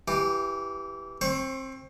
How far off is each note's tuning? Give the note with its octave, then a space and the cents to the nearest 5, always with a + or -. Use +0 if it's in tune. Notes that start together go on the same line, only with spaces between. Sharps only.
E3 +0 G4 +0
C4 +20 C5 +25 C#6 -20